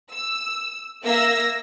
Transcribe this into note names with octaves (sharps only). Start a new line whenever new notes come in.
E6
A#3 E5 E6 A#6